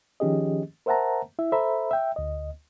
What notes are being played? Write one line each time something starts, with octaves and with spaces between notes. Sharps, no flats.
D#3 F3 C#4 G4 G#4 D#5
A#4 C5 E5 F#5 A5 A#5
E4 E5
A4 C5 E5 A#5 B5
E5 G5
D2 D#5